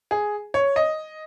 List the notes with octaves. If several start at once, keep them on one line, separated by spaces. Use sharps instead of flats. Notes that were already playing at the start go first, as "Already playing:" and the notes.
G#4
C#5
D#5